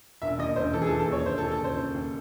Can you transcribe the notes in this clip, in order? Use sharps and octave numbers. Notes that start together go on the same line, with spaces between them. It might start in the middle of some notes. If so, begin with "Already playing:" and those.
E1 E5
D#2 D#5
E1 C5
E3 A4
G#4
A4
E3
A4
D#2 C#5
E1 C5
A4
D#2
A4
C#3 C5
C#3 C5
D#2